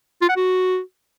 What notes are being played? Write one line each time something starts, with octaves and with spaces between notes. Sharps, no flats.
F4
F#5
F#4